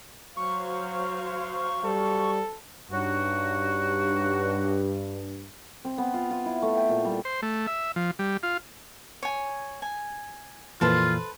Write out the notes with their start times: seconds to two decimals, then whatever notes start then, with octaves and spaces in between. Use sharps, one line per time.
0.37 F#3 C5 F5 C#6
1.84 G3 A4
2.91 G2 C#4 D#4 F#4
5.85 C4
5.98 B3
6.14 F4
6.30 F4
6.46 E4
6.62 A3
6.76 G5
6.89 A#2
7.05 G3
7.25 C5
7.42 A3
7.67 E5
7.96 F3
8.19 G3
8.43 F4
9.23 C#5 G#5
9.82 G#5
10.81 F2 A#2 E3 F4 A4 B4 C5